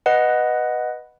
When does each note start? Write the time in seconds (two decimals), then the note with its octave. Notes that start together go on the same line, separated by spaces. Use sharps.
0.06 B4 D#5 F#5